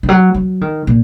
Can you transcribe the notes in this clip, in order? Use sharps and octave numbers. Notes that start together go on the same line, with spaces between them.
D#3
F#3
F#3
D#3
A#2